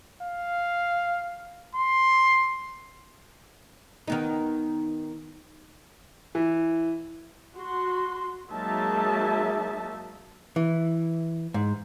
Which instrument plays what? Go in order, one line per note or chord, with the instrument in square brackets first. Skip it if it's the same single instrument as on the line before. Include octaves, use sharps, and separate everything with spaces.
[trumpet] F5
C6
[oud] D#3 B3 D#4
[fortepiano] E3
[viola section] F#4 C6
F#3 G#3 A#3 D#4 E5 A5
[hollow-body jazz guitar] E3
G#2